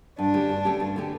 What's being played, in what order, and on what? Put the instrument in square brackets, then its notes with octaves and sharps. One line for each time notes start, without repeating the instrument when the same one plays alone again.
[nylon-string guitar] G2 [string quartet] D4
[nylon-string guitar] D3 A3 C#4 G4
G2
D3 A3 C#4 G4
G2
D3 A3 C#4 G4